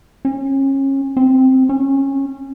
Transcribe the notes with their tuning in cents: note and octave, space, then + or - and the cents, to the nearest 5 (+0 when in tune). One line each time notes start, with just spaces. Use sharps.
C#4 -30
C4 +0
C#4 -20